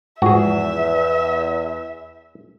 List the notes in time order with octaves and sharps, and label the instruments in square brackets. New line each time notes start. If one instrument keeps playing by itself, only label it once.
[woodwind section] E2 [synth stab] G#2 F3 G#4 [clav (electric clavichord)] F#4 [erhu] E5